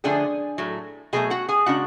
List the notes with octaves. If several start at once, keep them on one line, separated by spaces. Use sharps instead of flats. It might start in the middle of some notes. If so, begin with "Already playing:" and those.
D3 F3 A3 D4 G#4 G#5
A2 F#3 A3
B2 F#3 A3 G#4 G#5
F#4 F#5
G#4 G#5
C#3 G#3 D4 F#4 F#5